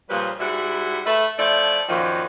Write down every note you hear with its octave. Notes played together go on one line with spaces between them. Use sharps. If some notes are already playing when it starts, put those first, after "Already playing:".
A#2 C#3 F3 G3 B4
G#2 G3 E4 F#4
A3 B4 E5
F3 A3 E4 D5
F#2 A#2 D#3 F3